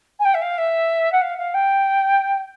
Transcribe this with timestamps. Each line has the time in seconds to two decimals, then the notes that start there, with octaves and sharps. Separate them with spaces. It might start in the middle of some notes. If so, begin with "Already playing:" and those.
0.19 G#5
0.25 G5
0.34 E5
0.42 F5
0.58 E5
1.12 F#5
1.21 F5
1.38 F5
1.54 G5